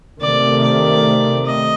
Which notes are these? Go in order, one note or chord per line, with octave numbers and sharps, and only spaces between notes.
C3 D#3 A3 C4 D5
D5
D#5